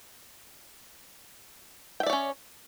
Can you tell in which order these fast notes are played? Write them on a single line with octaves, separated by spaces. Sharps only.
G5 E5 D5 C#5 C#4